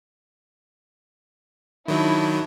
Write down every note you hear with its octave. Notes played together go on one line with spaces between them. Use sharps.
D#3 F#3 D4 E4